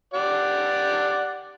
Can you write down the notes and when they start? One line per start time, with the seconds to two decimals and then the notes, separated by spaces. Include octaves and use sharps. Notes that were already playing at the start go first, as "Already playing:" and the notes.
0.14 G4 D5 F#5